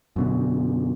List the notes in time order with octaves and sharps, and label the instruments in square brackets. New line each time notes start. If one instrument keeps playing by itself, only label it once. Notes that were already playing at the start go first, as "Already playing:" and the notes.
[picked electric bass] F#2 B2 D3